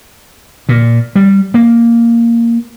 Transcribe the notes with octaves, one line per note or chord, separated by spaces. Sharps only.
A#2
G3
A#3